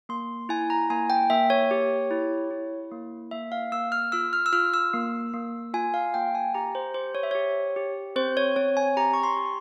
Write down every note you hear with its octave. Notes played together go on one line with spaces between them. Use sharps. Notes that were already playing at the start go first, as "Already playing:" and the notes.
A#3 C6
E4 G#5
A#5
A#3 G#5
G5
A#3 E5
C#5
G4
E4
E4
A#3
A#3 E5
F5
A#3 E6
F6
F4 E6
F6
E6
F4 F6
E6
A#3
A#3
F4 G#5
F5
A#3 G5
G#5
G4 A#5
C5
G4 C5
C#5
E5
G4 C#5
G4
C4 C5
C#5
C4 C#5
G#5
G4 A#5
C#6
C6
G4